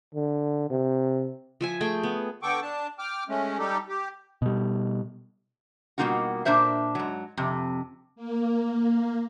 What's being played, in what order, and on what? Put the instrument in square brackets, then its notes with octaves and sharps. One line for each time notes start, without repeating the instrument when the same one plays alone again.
[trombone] D3
C3
[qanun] F3 E5 G#5
A3 G#4 G5
B3
[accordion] D3 B3 A4 G5 C#6 D6
D4 A5
G5 D6 F6
G#3 A3 C#4
G3 D#4 G4 A4
G4
[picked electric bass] B2 G3
[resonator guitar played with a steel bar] B2 G3 A#3 D#4 F4 F#4
A#2 D4 A#4 C5 E5
G#2 F#3
F2 C3
[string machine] A#3